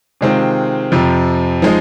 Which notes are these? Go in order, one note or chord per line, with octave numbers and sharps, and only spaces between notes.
C3 D#3 G#3 C4 F4
F2 C3 F3
F3 G#3 D#4